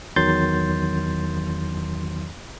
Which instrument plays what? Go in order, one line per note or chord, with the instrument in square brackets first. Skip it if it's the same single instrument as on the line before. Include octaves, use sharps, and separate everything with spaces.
[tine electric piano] E2 D#3 F#3 C6 G6 A6